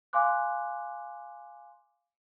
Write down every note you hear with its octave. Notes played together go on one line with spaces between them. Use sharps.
F5 G#5 C6 D6 F#6